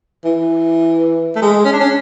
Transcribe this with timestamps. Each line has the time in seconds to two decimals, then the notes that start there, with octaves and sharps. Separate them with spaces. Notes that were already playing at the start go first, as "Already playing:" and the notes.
0.25 E3
1.36 A3
1.42 G#3
1.65 C#4
1.73 D4
1.80 C#4